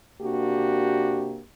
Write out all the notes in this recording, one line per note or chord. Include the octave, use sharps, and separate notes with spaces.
C3 A#3 D4 F#4 G4